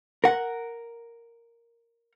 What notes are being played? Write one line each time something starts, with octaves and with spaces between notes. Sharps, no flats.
A#4 F#5